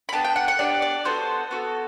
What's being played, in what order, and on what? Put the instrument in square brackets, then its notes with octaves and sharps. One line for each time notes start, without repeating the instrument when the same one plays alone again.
[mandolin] B5
B3 D4 G4 A5
G5
F#5
F#5
B3 D4 G4 D5
D5
B3 F#4 A4 C5
B3 F#4 A4